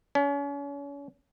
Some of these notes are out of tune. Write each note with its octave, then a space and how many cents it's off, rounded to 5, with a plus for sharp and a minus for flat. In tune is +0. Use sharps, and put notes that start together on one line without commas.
C#4 +35